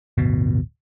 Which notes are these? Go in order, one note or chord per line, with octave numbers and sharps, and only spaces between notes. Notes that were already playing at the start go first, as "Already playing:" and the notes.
D1 G1 B2